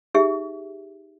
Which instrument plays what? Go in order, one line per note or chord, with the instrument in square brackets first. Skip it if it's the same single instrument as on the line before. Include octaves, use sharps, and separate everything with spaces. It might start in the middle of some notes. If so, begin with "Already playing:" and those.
[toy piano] D#4 G4 G#4 E5